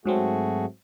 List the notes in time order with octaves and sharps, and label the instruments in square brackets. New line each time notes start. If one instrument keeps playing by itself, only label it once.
[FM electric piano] G#2 F#3 C4 [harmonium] A3 F#4 G#4